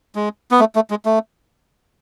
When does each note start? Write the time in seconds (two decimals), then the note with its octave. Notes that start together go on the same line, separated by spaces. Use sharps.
0.15 G#3
0.51 B3
0.60 A3
0.75 A3
0.90 G#3
1.05 A3